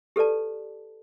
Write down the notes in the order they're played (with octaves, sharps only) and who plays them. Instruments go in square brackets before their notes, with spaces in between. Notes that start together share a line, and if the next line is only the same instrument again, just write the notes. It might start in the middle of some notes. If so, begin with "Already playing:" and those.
[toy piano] G4 A4 B4 D5 A5